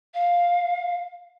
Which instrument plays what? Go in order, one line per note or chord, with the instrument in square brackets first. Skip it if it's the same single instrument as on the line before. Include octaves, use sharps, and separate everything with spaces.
[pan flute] F5